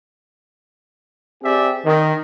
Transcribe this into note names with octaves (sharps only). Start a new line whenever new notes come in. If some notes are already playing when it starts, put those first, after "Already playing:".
C4 G4 G#4 D5 E5
D#3